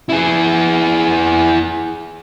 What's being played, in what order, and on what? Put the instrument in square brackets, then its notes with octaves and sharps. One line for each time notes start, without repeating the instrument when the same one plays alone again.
[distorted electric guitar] E4 G#4